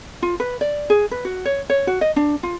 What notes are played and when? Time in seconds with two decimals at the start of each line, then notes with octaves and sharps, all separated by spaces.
0.22 F4
0.40 B4
0.61 D5
0.90 G#4
1.11 B4
1.25 F#4
1.45 C#5
1.70 C#5
1.87 F#4
2.01 D#5
2.16 D4
2.43 F4